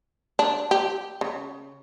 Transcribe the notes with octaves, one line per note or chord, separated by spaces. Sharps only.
D4
G4
C#3